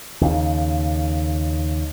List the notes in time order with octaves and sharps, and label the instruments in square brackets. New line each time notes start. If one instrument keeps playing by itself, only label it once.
[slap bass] D#2 C#3